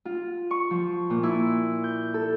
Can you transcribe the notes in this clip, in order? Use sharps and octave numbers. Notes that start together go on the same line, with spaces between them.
F4
C#6
F3
A#2
E4
G6
A4